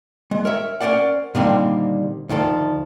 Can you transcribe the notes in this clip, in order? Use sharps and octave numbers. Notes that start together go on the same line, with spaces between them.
G#3
A#4 C#5 E5
C#4 A#4 C5 D5 F#5
A#2 D3 D#3 G3 A#3 C4
D2 D#3 F3 A4